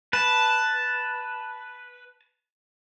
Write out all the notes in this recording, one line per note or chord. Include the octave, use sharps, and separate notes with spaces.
B4 A5